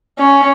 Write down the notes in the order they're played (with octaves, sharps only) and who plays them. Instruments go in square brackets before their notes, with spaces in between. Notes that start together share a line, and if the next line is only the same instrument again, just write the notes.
[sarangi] C#4